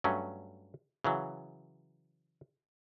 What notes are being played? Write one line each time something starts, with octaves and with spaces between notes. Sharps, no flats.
G2 F#3 A3 C#4
C#3 E3 F#3